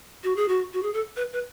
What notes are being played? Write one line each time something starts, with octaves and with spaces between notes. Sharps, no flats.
F#4
G#4
F#4
F#4
G#4
A4
B4
B4